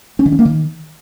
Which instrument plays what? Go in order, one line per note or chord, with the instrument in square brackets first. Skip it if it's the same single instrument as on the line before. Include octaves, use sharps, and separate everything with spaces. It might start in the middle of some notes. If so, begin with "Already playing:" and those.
[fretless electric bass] C#4
D#3
C#4
A#3
D#3